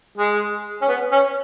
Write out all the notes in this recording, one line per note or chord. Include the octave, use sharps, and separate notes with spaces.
G#3
C#4
B3
C#4